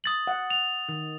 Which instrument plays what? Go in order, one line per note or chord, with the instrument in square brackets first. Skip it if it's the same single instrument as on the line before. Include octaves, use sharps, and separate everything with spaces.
[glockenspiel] D#6 A6 F#7
[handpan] F#5
[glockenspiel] F7
[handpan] D#3